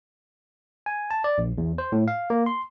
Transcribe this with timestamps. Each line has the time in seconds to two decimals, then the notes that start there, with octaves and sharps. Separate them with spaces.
0.86 G#5
1.11 A5
1.24 D5
1.38 A#1
1.58 E2
1.78 C5
1.92 A2
2.08 F5
2.30 A#3
2.46 C6